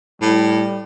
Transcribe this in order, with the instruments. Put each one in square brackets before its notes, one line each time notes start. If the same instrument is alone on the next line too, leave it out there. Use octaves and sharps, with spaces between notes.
[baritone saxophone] A2 [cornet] G3